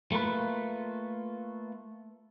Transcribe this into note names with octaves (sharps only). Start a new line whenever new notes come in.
A3 A#3 F4 B4